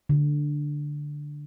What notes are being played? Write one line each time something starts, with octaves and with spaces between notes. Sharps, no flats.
D3